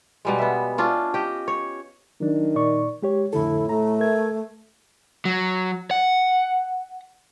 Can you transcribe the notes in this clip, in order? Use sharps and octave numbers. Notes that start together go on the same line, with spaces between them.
B2 G3 G#3
B3 E5
C#4 D4 F4
G4 D#5
C#5
D#3 F#3 D4
A#2 D5 C#6
G#3 G4 C#5
F2 A2 D3 E4 A4
A3 A#5
A#4 E5 G#6
F#3
F#5